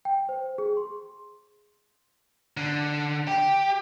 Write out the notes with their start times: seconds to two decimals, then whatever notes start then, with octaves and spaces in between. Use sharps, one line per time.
0.05 G5
0.29 C5
0.58 G#4
0.77 C6
2.57 D3
3.27 G4